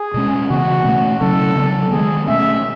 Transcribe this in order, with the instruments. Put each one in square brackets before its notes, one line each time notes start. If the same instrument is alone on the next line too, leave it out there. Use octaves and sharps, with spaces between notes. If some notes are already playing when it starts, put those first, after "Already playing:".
Already playing: [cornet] G#4
[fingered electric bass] B2 G#3 C#4
[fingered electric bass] C#3 E3 B3 [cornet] F#4
[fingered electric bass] B2 A3 C#4
[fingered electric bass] C#3 F#3 C#4 [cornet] A4
[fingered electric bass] C#3 F#3 B3
[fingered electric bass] D#3 G#3 B3 [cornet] G#4
[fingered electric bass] B2 A3 C#4 [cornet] E5